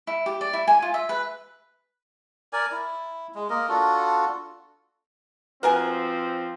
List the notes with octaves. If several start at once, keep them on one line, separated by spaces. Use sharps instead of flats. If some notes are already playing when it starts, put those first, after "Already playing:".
E4
G4
D5
E4
G#5
F4
E5
B4
A#4 D5 G#5
E4
G#3
A#3 A#4 D#5
D4 F4 F#4 A4
F3 C4 F#4 A#4 B4 G#5